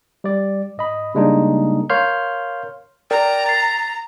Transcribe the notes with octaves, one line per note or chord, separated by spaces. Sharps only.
G3 D5
G#2 D#5 B5
C#3 G3 G#3 A#3 D4 D#4
A#4 C#5 F5 C6 F6 G6
A#4 D5 G5 A#5
A6 C7